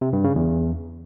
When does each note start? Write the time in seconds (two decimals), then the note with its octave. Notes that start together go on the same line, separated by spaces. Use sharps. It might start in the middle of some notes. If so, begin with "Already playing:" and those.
0.01 C3
0.13 G2
0.24 C#3
0.36 E2